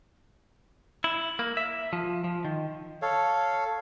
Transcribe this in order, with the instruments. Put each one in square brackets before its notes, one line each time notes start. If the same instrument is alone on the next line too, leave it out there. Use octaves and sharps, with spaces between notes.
[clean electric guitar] E4
A#3
E5
F3
F3
D#3
[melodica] A4 C#5 F5